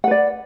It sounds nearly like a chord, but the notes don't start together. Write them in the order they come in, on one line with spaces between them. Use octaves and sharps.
F#5 B4 D5